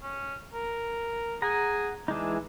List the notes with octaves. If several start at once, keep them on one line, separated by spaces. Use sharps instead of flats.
C#4
A#4
G#4 F#5 A#5
E3 G#3 D4 D#4